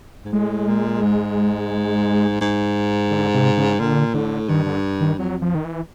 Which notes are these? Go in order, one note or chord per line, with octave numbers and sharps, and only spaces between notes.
G#2
A2 G#3
A#2
G#2
G#2
D3
C3
C#3
A#2 D3
A2 D3
G2 D#3
D3
D#3
F2 F#3
F3
D#3
E3